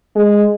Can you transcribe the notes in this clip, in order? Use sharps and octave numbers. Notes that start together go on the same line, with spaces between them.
G#3